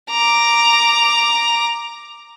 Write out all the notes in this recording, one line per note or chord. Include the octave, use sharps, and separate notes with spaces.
A#5 D6